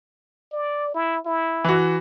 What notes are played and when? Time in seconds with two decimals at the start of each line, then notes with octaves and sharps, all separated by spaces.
0.52 D5
0.94 E4
1.25 E4
1.64 E3 F#4